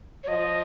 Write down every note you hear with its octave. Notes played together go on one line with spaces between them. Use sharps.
C#5
F3 D#5